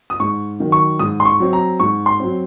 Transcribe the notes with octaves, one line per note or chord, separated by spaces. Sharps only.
D#6
G#2 C#6
D#3 F#3
C#6
G#2 D#6
C6
C#6
F#3 C4
A#5
G#2 C#6
C6
F#3 C4